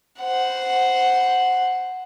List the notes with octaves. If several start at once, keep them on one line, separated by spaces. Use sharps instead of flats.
C5 F#5